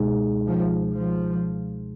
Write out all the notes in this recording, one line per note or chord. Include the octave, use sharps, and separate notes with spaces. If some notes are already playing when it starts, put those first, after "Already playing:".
Already playing: C#2 B2 G#3 D#4 G#4
F3
F3